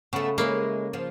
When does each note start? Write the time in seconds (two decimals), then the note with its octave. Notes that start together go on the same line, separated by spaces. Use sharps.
0.13 C#3 A3 B3
0.38 G#3 A#3 E4 C#5
0.93 F3